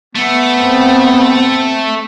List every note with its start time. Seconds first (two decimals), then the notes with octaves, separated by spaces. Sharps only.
0.15 A3 B3
0.59 C4